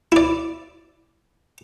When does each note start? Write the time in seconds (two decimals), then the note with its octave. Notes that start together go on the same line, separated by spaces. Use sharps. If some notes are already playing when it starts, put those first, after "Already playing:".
0.12 E4 D5